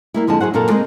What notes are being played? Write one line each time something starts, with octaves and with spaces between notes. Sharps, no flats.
G3 A#3 E4
F2 D3 F3 G#3 A5
F#3 G#4 C5 F#5
F#2 A#2 F4 A4 A#4 A5
G#3 A#3 C4 D#4